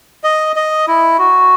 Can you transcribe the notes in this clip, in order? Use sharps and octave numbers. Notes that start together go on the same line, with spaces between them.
D#5
D#5
E4
F#4